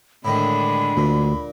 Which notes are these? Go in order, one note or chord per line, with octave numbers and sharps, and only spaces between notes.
A2 D3 D#3 G#3 D4 B5
D2 A#2